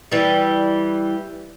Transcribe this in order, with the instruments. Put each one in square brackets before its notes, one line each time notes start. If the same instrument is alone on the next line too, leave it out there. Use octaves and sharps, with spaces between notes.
[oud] E3 G3